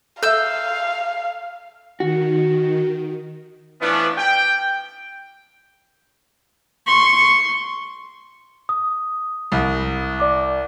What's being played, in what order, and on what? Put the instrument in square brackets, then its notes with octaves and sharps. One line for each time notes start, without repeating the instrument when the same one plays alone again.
[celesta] A4 E5 [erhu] F5 [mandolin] E6 G6
[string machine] D#3 [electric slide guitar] F#4
[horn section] E3 F3 A3 B3 C#4 D4
G5
[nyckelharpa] C6 C#6
[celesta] D#6
[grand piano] C2
[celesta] D5 D6